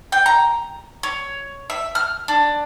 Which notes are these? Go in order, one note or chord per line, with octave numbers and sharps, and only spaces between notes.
G5
A#5
C#5
E5
F6
D4